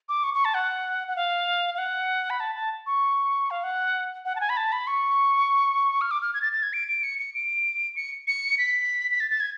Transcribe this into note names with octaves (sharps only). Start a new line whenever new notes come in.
D6
C#6
C#6
A5
F#5
F#5
F5
F5
F#5
B5
A5
A5
C#6
F5
F#5
F#5
A5
G#5
B5
A5
B5
C#6
F6
D6
F6
G#6
A6
A6
G#6
D7
D7
C#7
C#7
D7
C#7
C#7
B6
B6
A6
A6
G#6